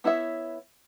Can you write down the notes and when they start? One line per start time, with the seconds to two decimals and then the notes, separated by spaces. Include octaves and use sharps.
0.04 B3 E4 C#5 E5